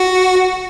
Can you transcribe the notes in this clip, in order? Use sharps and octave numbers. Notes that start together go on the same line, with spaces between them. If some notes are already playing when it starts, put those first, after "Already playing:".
Already playing: F#4